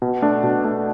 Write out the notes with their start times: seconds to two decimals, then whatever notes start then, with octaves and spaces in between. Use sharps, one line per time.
0.02 B2
0.22 A3 D4
0.43 B2
0.64 A3 D4